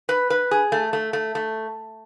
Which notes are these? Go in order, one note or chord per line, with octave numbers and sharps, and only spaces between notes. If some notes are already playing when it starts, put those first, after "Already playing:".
B4
B4
G#4
A3
A3
A3
A3